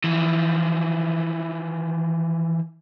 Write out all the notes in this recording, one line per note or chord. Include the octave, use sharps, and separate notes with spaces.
E3 F3